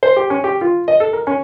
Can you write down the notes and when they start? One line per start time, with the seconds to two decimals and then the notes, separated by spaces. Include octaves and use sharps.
0.03 C5
0.16 G4
0.30 C#4
0.44 G4
0.61 F4
0.88 D#5
1.00 A4
1.13 A#4
1.27 C#4